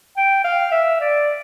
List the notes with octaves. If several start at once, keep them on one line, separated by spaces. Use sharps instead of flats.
G5
F5
E5
D5